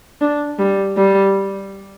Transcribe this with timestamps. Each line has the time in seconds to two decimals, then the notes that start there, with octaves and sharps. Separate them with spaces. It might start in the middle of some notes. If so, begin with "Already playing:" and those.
0.21 D4
0.59 G3
0.97 G3